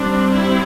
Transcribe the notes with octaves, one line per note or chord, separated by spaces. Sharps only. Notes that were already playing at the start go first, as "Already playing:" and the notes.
Already playing: G3 C4 D4
E4